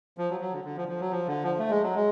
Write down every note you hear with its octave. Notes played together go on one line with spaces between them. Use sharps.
F3
F#3
F#3
D3
D3
F3
F3
F#3
F3
D3
F3
A3
G#3
F#3
G#3